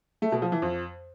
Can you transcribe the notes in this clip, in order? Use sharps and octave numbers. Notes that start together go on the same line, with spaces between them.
A3
B2
F3
E3
F2